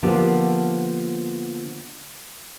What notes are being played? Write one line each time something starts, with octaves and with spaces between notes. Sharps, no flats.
D3 F3 A#3 B3 F4 G4